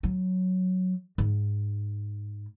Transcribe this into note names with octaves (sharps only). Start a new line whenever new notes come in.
F#3
G#2